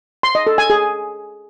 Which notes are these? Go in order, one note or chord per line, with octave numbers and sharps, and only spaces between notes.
C6
D#5
A4
G#5
G#4